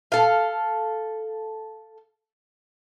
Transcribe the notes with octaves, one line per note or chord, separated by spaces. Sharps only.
A4 F5